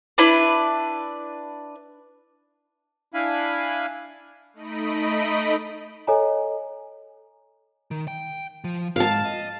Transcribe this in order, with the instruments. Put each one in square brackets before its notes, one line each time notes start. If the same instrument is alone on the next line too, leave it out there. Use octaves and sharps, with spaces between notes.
[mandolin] D4 E4 B4 D5
[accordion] D4 E4 F5 G#5 B5
[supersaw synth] A3 D#4 D#5 B5 D7
[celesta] A4 C#5 D#5 G#5 A#5
[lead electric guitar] D#3
G5
F3
[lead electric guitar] G#2 [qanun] F5 A5
[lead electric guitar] D#5